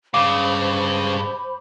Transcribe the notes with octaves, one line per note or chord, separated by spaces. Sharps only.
G2 C#3 C5 F5 B5 D6